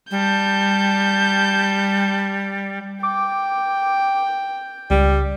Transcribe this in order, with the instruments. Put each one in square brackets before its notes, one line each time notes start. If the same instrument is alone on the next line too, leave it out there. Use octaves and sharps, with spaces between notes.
[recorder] G3 [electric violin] A5 G6
[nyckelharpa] G5 [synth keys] D6
[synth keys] C#2 [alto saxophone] G3